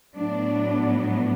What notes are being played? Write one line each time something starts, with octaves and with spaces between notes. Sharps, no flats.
A2 F#3 B3 D4
D4